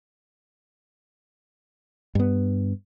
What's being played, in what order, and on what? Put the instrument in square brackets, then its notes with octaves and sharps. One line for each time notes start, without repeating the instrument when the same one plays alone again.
[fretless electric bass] G2 B3